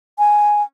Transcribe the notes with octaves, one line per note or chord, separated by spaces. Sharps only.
G#5